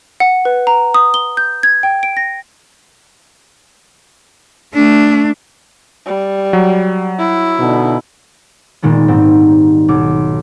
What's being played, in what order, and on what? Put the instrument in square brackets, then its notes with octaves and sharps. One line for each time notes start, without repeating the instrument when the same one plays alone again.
[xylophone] F#5
B4
A#5
D#6
G7
G6
G#6
G5
D7
A#6
[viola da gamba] A3 [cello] D4
[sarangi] G3
[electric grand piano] F#3
[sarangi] E4
[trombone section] B2 D3 D#4
[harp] A#2 D#3 G#3 B3
G#2 G3 C4
B1 D6